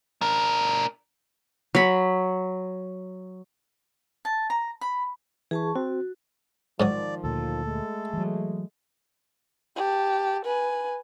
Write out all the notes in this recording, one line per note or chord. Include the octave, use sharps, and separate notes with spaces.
D4 A#4
F#3 B5
A5
A#5
B5
E3 G#4 A5 C#6
C4 F#4
G#2 D#3 F3 F#3 D5 D#6
D2 A#2 A4
G#3 A3
E3 F#3
G4 A5
B4 G#5